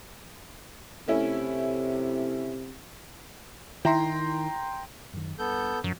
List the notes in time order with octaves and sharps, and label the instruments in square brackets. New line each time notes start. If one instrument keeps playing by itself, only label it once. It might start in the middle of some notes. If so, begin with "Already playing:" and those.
[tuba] C3 [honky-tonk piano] A3 C#4 E4
[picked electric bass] D#3 [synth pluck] E4 [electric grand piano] G5 A#5 C6
[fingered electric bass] F#2 D#3
[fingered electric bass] G2 [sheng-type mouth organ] B3 A4 G6
[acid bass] F#2 [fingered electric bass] F3 F#3